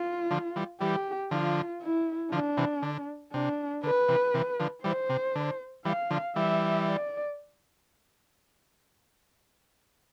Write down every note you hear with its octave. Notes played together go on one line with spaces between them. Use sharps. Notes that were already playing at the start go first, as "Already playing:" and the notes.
Already playing: F4
D3 F3
E3 G3
E3 G3 G4
D3 F3 F4
E4
D3 F3 D4
C3 E3
D3
C3 D4
D3 B4
C3 E3
C3 E3
D3 F3
E3 G3 C5
C3
D3
E3 G3 F5
D3 F3
E3 G3 E5
D5